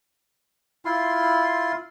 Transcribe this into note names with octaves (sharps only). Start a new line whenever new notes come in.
E4 F4 C6